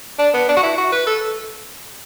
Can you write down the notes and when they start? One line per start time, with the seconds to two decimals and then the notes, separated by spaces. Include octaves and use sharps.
0.19 D4
0.34 B3
0.49 D4
0.57 F#4
0.63 E4
0.78 F#4
0.92 B4
1.07 A4